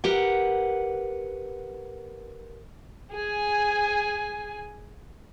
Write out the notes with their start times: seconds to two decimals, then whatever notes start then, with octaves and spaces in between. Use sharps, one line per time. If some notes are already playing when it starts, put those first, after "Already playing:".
0.04 G4 A#4 B4 F#5
3.12 G#4 G#5